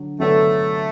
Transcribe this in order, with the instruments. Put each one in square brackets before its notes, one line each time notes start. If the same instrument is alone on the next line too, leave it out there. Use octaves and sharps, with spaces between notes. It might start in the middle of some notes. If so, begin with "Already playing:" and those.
Already playing: [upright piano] D3 F#3 D4
[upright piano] D3 F#3 B3 D4 [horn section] A3